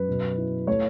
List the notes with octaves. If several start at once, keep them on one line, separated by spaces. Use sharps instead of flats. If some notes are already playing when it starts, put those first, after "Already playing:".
Already playing: F#2 B4
B2
E4
A3 C#5